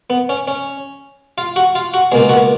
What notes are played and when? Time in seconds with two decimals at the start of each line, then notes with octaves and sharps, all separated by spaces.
0.10 B3
0.29 C#4
0.48 C#4
1.38 F4
1.56 F#4
1.75 F4
1.94 F#4
2.12 C#2 B2 A#3 G#4
2.29 F#4